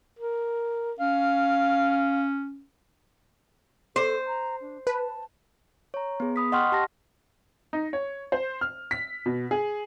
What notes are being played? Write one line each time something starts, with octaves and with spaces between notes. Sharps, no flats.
A#4
C#4 F5
A4 C5
A#5
D4
B4 A5
C#5 A#5
B3 G#4
B5 D#6 B6
D#5 F#5 G5 C6 C#6 F6
G4 A5 A#6
D#4
C#5
C5
F6
B6
B2
G#4